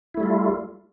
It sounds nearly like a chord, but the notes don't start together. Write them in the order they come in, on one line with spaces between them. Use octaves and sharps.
E4 A3 G3 F4